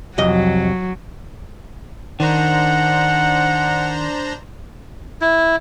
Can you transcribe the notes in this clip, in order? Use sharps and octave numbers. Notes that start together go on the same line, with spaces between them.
C2 F2 F#3 D#5
D#3 D4 C5 F#5 A#5
E4